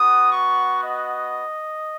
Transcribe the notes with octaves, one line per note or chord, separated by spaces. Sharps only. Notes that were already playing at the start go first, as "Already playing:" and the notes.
Already playing: B3 F#4 D#6
C#6
D#5